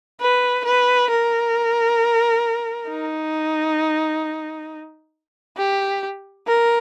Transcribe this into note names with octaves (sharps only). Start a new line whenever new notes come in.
B4
B4
A#4
D#4
G4
A#4